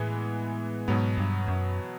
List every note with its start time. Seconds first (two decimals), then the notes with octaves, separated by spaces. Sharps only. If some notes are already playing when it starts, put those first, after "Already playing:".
Already playing: A2 E3 G#3 B3
0.88 G#2 B2 F#3 B3
1.18 G2
1.48 F#2